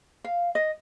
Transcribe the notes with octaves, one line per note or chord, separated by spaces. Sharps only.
F5
D#5